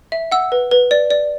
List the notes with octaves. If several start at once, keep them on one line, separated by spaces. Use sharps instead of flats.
E5
F#5 E6
B4
B4
D5
D5